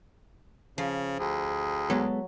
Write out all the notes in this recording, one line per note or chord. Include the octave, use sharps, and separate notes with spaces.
C#3 F3
D2 G#4
F#3 G#3 B3 A4